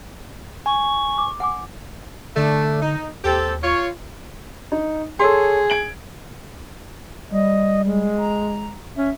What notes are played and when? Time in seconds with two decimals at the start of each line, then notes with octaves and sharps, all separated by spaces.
0.66 G#5 C#6
1.18 D6
1.40 F#5 G#5 D6
2.36 D3 A3 D4
2.82 D#4
3.25 D#2 C4 G4 A4
3.63 F4 C#5
4.72 D#4
5.19 G#4 A4 C#5 C6
5.70 G#6 D7 F#7
7.31 G3 D#5
7.84 G#3
8.18 A#5
8.96 C#4 E5